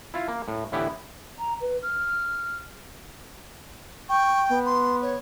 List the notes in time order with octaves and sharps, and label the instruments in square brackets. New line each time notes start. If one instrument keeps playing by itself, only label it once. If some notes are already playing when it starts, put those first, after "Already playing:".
[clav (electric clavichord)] E4 F4 F5
A#3
A2
A2 D3 E3 B3 E4 G4
[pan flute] A#5
B4
F6
[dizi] G5 [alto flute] C#6
[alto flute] B3
[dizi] C6
C#5